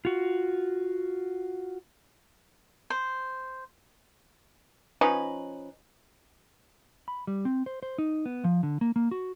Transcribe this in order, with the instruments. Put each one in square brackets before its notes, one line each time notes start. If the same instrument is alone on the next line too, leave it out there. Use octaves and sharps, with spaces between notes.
[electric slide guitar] F4 F#4
[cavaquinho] C5
[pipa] F3 C#4 D#4 B4
[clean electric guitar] B5
G3
C4
C5
C5
D#4
B3
F3
D3
A#3
A#3
F#4